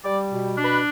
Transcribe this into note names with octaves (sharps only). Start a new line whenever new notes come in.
G3 D5
B2
D4
B4